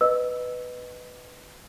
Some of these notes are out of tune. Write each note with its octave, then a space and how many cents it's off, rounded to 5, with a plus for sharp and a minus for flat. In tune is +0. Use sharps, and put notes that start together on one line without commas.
B4 +5 D#5 -10 E6 +0